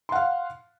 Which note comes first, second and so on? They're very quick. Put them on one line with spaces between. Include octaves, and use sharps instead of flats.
C6 F#5 F5